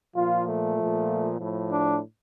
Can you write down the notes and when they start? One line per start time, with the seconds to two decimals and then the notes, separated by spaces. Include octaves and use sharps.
0.16 A#2 F3 F4
0.46 A3
0.78 A#2 F3
1.39 A2 F3
1.69 D4